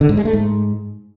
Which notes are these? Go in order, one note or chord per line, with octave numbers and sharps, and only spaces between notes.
D3
G#2
G#3
A3
G#2